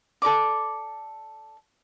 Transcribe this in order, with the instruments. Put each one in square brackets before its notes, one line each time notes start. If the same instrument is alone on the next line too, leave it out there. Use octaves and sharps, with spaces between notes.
[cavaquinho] A4 A#4 D5 D6